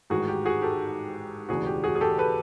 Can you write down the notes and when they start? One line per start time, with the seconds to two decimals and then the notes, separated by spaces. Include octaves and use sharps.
0.10 A1 G#2 D#3 F#4 G#4
0.28 G4
0.45 F#4 G#4
0.62 G4 A4
1.49 E1 D2 C#3 E3 F#4 G#4
1.66 G4
1.84 F#4 G#4
1.95 G#4
2.01 G4 A4
2.18 A4 B4